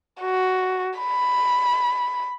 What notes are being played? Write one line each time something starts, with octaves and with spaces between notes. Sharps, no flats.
F#4
B5